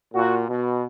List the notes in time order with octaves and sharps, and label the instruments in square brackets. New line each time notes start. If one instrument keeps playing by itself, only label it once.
[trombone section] A#2 [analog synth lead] F#4
[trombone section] B2